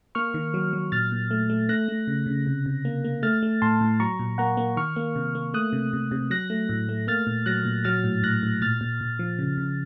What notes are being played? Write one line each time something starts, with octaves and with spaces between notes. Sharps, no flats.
A#3 C#6 F6
D#3
F#3
F#3
A#2 F6 A6
A#2
A3
A3
A3 F#6 A#6
A3
C#3
C#3
C3
C3
A#3
A#3
A3 F6 A6
A3
A2 A5 C6
A2
F#3 A#5 C#6
A#2
A#3 F#5 A#5
A#3
D#3 C#6 F6
A#3
C3
A#3
A3 D#6 F#6
C3
C3
C3
F#3 F#6 A#6
A3
A2
A3
A#3 F6 A6
A#2
F#3 F#6 A#6
A#2
F#3 F6 A6
A2
A2 F#6 A#6
A2
A#2 F6 A6
A#2
A#2
F3
C#3
C#3